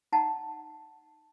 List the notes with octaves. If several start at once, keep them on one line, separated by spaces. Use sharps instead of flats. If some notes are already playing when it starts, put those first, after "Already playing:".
D#4 F#5 A5 A#5